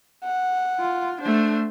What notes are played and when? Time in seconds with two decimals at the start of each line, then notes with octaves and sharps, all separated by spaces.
0.24 F#5
0.80 F4
1.21 A3 D4 C5